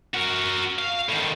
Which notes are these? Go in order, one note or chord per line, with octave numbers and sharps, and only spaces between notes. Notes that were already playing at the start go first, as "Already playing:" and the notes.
F#4 A#4
F5
A2 D#3